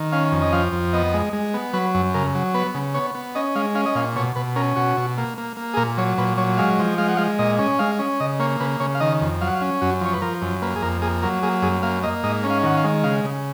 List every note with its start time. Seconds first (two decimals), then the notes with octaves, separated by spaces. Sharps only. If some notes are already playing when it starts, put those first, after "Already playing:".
Already playing: D#3
0.12 C#4 F5
0.32 F2
0.42 D#5
0.53 F3 F5
0.73 F2
0.93 B3 D#5
1.14 G#3
1.33 G#3
1.54 B3
1.73 F#3 B4
1.95 F#2
2.14 C#3 A#4
2.35 F#3
2.54 B3 B4
2.75 C#3
2.94 B3 C#5
3.15 B3
3.35 C#4 D#5
3.56 G#3 F5
3.75 C#4 F5
3.86 D#5
3.95 A#2 F5
4.15 B2 C#5
4.36 B2 B4
4.56 C#4 A#4
4.76 B2 F#4
4.97 B2
5.18 A#3
5.38 A#3
5.57 A#3
5.74 G#4
5.77 A#2 A#4
5.98 F#3 C#5
6.18 A#2 B4
6.37 F#3 C#5
6.58 G#3 F5
6.79 F3
6.98 G#3 F5
7.09 F#5
7.17 G#3 F5
7.39 A#2 D#5
7.59 C#4
7.79 G#3 F5
7.99 C#4
8.20 C#3 D#5
8.39 A#3 C#5
8.60 C#3 B4
8.80 C#3 C#5
8.95 F5
9.00 D#3 D#5
9.21 F2
9.41 F#3 F5
9.47 F#5
9.54 F5
9.61 C#4
9.81 F#2 F#4
10.01 F3 C#5
10.13 B4
10.22 F3 A#4
10.42 F#2
10.62 A#3 B4
10.76 G#4
10.82 F2 A#4
11.02 A#3 G#4
11.23 F#3 A#4
11.43 A#3 G#4
11.62 F#2 G#4
11.82 A#3 F5
12.03 A#3 D#5
12.23 G#2 D#5
12.44 C#4
12.50 F5
12.63 D#3 F#5
12.77 F5
12.84 G#3
13.04 C#3 F5
13.24 C#3